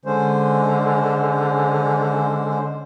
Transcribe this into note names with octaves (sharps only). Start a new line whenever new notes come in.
D3 G#3 C#4 C5